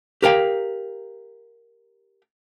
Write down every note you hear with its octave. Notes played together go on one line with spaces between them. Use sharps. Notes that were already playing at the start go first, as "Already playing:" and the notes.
G4 A#4 F5 G5